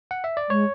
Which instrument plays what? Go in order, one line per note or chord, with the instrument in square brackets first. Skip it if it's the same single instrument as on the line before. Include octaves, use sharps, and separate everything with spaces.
[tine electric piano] F#5
E5
D5
[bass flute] G#3 [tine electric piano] C#5